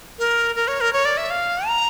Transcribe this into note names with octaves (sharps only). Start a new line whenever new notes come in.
A#4
A#4
C#5
A#4
C#5
D5
E5
F5
A#5